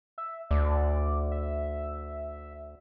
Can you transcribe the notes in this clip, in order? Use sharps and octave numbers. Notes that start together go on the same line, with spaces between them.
E5
D2 D5
E5